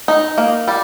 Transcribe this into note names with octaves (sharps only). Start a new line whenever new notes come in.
D#4
A#3
G3